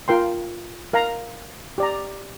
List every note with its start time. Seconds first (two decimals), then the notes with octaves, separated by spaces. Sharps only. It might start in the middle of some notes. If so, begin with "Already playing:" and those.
0.08 F4 A#4 G5 C6
0.93 A#4 F5 A#5
1.78 G4 D5 A#5